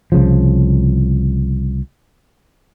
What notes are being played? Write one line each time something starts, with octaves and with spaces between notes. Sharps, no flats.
C2 C#3 F3